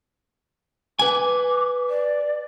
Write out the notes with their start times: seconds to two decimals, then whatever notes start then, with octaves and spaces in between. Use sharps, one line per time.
0.99 B4 G#5 D6
1.89 D5